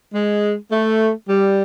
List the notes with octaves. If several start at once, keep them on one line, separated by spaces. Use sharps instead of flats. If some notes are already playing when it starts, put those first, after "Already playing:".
G#3
A3
G3